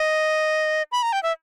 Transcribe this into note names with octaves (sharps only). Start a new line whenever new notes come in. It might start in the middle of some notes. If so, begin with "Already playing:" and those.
Already playing: D#5
B5
A#5
G5
E5